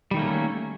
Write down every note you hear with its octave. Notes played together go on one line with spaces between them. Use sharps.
D#3 G3 A3 A#3 C#4